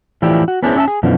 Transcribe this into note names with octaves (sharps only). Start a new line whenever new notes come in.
A2 E3 F3 E4 G4 D5
F#4
B3 C#4 D4 E4 G#4 C5
C#4 E5 G#5 A5
G#4
F#2 B2 D3 E3 F3